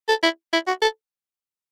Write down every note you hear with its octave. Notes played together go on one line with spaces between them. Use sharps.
A4
E4
E4
F#4
A4